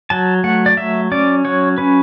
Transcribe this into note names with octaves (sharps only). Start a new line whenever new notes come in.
F#3 A5
A3 F#5
D5
F#3 E5
C#4 D5
F#3 C#5
C#4 B4